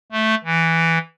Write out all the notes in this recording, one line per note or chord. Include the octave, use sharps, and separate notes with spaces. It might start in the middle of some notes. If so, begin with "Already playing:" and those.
A3
E3